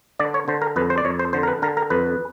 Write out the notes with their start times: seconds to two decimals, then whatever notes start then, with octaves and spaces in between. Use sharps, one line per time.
0.19 D3 D5
0.34 C#5
0.48 D3 C5
0.62 A#4
0.76 F2 B4
0.90 C5
0.98 D5
1.05 F2 C#5
1.19 C5
1.33 D3 C5
1.43 A#4
1.48 B4
1.62 D3 A#4
1.77 A#4
1.90 F2 B4